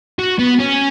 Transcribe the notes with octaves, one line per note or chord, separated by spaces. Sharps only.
F#4
B3
C#4